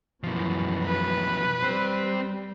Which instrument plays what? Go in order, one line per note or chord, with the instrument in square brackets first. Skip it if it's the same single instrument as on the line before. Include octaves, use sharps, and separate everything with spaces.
[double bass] F#2 E3 [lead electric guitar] B2 F3
[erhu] B4
[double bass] G3 [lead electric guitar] C4 C5